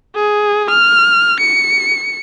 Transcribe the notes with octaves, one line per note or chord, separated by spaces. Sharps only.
G#4
F6
C#7